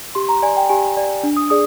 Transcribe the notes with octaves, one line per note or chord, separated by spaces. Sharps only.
G4 C6
A#5
D5 G#5
G5
G4 G#5
D5
D4
D#6
G#4 D5 D#6